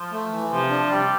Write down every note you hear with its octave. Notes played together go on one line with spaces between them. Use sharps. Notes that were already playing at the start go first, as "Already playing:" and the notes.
Already playing: F3
A3
E3
C3 F3
D4
C3 G3